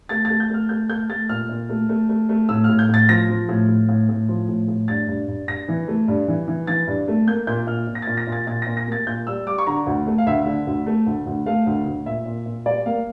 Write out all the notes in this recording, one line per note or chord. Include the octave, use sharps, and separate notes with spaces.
A3 A6
A3 A6
G6
A3 F6
A3 G6
A3 G6
A3 A6
A#2 F6
A#2
A3
A3
A3
A3
A2 E6
A2 F6
G6
A2 A6
F3 A#6
F3
A2
A2
A2
A2
F3
A2
A2
G2 A6
G2
G2
G2 A#6
E3
A3
G2
E3
E3
E3 A6
G2
A3
A#3 G6
A#2 G6
A#2 F6
A#2
A#6
A#2 A6
A#6
A#2
A6
A#2 A6
A#2 A#6
A#6
A#3 A6
A#2 G6
G3 E6
G3 D6
C#6
D3 A#5
D2
A3
F5
D2 E5
D3
D2
A3
D2
D2
A3 F5
D2
D2
A#2 E5
A#2
A#2
G3 D5
A#3 F5